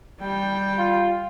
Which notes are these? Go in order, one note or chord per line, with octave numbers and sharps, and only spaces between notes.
G3 G5
F4